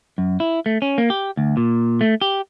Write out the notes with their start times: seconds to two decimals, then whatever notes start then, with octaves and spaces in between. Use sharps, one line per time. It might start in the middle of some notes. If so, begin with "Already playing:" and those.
0.18 F#2
0.40 E4
0.66 A3
0.82 C#4
0.98 A#3
1.10 G4
1.37 D2
1.57 A#2
2.01 A3
2.21 G4